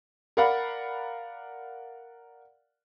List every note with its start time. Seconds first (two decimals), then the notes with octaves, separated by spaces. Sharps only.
0.37 A#4 D5 F5 F#5 B5